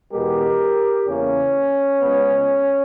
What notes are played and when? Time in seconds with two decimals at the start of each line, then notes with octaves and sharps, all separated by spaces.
0.12 E2 B2 G#3 B3 G4 A#4
1.06 E2 C#3 E3 A#3 C#4
2.01 C#2 C#3 G#3 B3